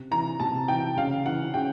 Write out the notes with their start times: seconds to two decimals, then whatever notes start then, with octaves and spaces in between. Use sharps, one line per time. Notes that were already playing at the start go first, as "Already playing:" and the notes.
Already playing: C3
0.11 E3 A#5
0.40 C3 A5
0.68 E3 G5
0.97 C#3 F5
1.26 E3 F#5
1.54 C#3 G5